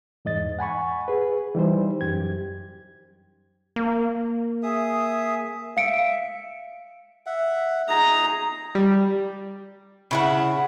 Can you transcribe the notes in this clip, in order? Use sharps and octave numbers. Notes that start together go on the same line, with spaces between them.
E2 G#2 D#5 A6
F#5 G#5 B5 C#6
G#4 B4
E3 G3 D#4 C5
F#2 G4 G#6
A#3
G#4 E5 D#6
E5 F5 C#7 D7
E5 F#5
D#4 G#4 A#5 D#6
G3
C#3 E4 F#5